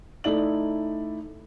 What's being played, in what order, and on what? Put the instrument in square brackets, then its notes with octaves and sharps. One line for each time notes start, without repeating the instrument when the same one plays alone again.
[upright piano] A3 D#4 E4 D5 F#7